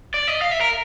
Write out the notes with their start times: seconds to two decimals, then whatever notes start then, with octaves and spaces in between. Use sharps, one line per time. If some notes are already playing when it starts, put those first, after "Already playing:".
0.14 D5
0.28 D#5
0.42 F5
0.51 E5
0.61 A#4